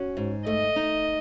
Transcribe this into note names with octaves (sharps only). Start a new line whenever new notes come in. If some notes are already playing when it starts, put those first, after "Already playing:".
Already playing: C#4 F#4
G#2
A3 D#5
D#4